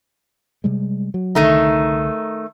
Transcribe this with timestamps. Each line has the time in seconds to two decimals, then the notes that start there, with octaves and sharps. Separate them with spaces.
0.64 C3 G3 G#3
1.14 F#3
1.35 C2 D3 D#3 A3 D#4